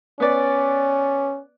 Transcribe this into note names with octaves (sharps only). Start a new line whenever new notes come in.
B3 C#4 D5